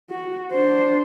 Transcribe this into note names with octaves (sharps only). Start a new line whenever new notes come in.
F#4
D4 C5